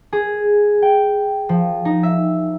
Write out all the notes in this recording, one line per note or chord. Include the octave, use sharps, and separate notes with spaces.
G#4
G5
F3
D#4
E5